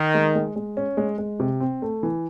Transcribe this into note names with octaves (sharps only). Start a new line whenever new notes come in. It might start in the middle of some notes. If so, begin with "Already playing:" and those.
Already playing: D#3
G#3
G#3
G#3
C#4
G#3
G#3
C3
C4
A3
E3